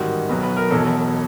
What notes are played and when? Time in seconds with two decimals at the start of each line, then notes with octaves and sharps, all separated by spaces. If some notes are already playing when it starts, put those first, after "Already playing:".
Already playing: A1 G#2 D#3 G3 F#4
0.29 B1 B2 F#3 B4
0.43 B4
0.57 A#4
0.71 E1 E2 B2 F#3 A4